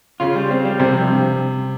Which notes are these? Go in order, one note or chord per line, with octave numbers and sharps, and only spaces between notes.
C#3 F4
G3
C4
G3
C3 C4
F2
G2